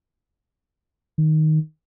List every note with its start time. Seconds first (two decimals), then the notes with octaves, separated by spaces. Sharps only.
1.18 D#3